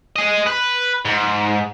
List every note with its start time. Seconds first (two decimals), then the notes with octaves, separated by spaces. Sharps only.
0.16 G#4 D#5
0.46 B4
1.05 G#2